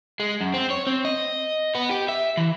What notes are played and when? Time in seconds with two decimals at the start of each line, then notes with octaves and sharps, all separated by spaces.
0.20 G#3
0.41 F#2
0.54 C4
0.70 C#5
0.87 C4
1.05 D#5
1.75 B3
1.91 G4
2.09 E5
2.37 E3